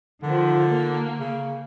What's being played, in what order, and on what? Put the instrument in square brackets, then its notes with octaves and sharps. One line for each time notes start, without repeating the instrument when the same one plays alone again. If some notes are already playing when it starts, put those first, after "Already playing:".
[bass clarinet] D3 [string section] D#3 F3
[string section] A#3
[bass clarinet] C#3